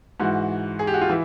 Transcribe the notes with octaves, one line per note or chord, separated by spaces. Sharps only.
G#2 E3 F#4
G#4
G4
F#4
F4
E3 E4